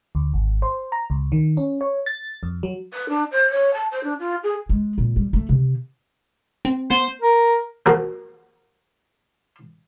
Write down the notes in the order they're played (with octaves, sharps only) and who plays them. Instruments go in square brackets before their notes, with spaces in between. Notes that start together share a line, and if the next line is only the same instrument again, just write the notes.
[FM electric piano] D2
G#1
C5
A#5
C#2
D#3
C#4
C#5
A6
F2
F#3
[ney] B4
D4
C5
C#5
A5
C5
D4
F4
G#4
[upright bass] G#3
A#2
G3
A3
C3
[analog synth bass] C4
[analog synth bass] B3 [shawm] C5
[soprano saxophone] A#4
[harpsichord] F3 A#3 F#4 G#4 A#5